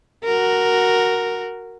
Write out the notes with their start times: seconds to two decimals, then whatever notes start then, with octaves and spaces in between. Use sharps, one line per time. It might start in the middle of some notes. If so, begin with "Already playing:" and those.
0.24 F#4 A#4